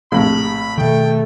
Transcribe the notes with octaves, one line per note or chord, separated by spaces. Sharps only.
A#1 A2 C3 B5
B2 D#3 A3 G5